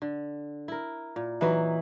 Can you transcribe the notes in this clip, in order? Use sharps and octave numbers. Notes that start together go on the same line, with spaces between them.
D3
E4 A#4
A#2
E3 F#3 D#4 B4